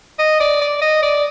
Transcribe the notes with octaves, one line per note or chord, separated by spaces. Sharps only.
D#5
D5
D5
D#5
D5